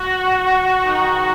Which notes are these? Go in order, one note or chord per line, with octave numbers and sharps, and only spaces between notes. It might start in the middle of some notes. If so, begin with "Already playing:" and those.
Already playing: F#4
G#2 D#3 G#3 D#4